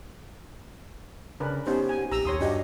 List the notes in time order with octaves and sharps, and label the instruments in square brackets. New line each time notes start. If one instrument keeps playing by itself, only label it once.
[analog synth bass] C#3 [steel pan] D4 A#4 B4
[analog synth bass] B3 [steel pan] C#4 D#4 C5 [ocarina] G4
[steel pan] G#5
[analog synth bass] A#1 [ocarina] G4 [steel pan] A#5 E6
[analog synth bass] D#2 [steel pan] C#5 C6 D#6
[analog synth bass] G2 [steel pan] D4 F#4 G4 [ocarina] D#5